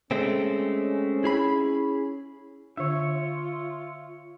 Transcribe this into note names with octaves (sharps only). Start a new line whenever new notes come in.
G#3 A3 C4 C#4
E4 G#4 B5
D3 D4 F4 C#5 E5